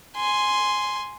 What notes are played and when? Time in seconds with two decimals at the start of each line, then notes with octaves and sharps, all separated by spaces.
0.16 G#5 C6